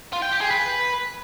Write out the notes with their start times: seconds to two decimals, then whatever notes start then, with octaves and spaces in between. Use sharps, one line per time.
0.13 F4
0.22 G5
0.32 G4
0.41 G#4
0.50 B4